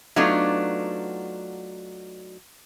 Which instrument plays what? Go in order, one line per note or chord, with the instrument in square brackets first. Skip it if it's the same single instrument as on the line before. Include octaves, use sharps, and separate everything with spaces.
[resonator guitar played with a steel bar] F#3 A3 B3 D4 D#4 F4